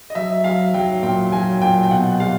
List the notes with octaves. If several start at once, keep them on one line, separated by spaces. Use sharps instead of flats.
D#5
F#3 E5
F#3 F5
F#3 G5
A#2 G5
F#3 G#5
A#2 G5
G5
B2 F#5
G3 F5